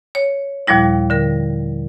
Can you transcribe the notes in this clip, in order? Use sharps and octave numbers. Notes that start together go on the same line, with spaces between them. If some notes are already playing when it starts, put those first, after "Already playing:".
C#5
D#2 A#2 F3 G3 E4
D3 A#4